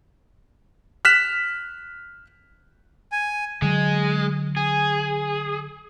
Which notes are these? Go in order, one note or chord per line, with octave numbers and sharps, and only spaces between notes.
F6 F#6 B6 E7
G#5
D3 F#3 G#3
G#4